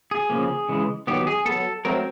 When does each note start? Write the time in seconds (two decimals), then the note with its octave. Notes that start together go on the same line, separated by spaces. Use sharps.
0.11 G#4
0.30 C#3 F3 A#3
0.69 C#3 E3 G#3
1.07 D#3 F#3 B3 G4
1.27 G#4
1.45 F#3 B3 A4
1.85 F#3 A3 C4 A#4